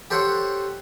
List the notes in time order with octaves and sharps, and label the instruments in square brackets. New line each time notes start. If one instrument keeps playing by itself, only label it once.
[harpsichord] G4 A4 C5 C#5 F#5